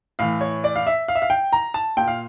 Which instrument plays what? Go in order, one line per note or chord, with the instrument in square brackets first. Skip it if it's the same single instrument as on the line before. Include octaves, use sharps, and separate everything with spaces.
[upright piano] A2 E3 F5
C#5
D5
F5
E5
F5
E5
F5
G5
A#5
A5
A#2 G5
F5